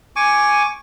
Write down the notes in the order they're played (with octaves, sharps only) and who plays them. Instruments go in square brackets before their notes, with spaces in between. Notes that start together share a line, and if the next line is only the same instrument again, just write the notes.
[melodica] G#5 C#6 D6